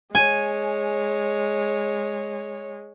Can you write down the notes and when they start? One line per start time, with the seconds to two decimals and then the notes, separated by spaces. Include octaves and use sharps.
0.15 G#3 C#5 G#5